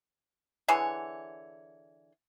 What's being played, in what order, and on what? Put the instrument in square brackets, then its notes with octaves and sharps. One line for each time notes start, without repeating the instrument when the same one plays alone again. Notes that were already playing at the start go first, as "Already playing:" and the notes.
[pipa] D3 E3 G#4 C#5